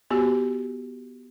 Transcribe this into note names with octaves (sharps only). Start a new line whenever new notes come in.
B3 F#4 G4